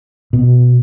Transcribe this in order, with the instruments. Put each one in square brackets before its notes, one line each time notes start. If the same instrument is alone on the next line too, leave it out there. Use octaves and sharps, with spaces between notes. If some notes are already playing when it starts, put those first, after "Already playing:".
[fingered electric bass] B2